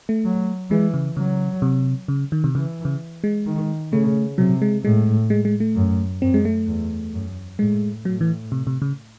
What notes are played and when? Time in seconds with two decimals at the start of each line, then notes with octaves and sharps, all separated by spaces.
0.09 A3
0.25 F#3
0.70 E3 G#3
0.94 C#3
1.17 C#3 F#3
1.62 C3
2.08 C#3
2.32 D#3
2.44 C3
2.55 C#3 E3
2.85 C#3
3.24 G#3
3.46 D#3
3.92 C#3 A3
4.38 C3 F#3
4.62 G#3
4.84 A2 G#3
5.30 G#3
5.45 G#3
5.60 A3
5.76 F#2
6.22 F#2 C4
6.34 G#3
6.45 A3
6.67 E2
7.13 F#2
7.59 A2 G#3
8.05 A2 F#3
8.21 E3
8.52 C3
8.67 C3
8.82 C#3